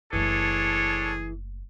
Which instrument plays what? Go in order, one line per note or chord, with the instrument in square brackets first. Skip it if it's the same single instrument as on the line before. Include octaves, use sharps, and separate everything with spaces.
[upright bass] F#1 A3 [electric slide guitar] E3 [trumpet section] D4 A4 C#5 [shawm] G#4